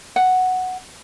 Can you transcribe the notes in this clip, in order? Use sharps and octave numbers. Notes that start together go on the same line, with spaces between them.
F#5